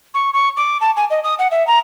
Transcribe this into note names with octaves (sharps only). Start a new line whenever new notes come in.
C#6
C#6
D6
A5
G#5
D#5
D#6
F#5
E5
A#5